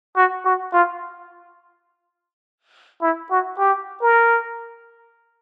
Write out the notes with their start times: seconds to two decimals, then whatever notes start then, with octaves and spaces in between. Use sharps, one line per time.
0.16 F#4
0.45 F#4
0.73 F4
3.02 E4
3.30 F#4
3.59 G4
4.01 A#4